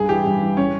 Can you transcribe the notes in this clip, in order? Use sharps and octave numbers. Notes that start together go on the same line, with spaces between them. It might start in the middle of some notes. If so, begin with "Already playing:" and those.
Already playing: G2 G#4
E3 G4
G2
E3
C#4